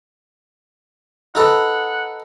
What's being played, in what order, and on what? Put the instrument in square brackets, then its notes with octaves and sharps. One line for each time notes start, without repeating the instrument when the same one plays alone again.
[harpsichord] D#4 A4 B4 [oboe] F#5